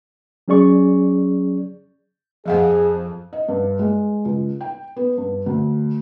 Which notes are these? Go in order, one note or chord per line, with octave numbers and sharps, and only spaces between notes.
F#3 C#4 G#4 D5 C#6
F2 F3 G#4 F5 F#5
D#5
G2
G#3
C#2
G5
B3
G2
D2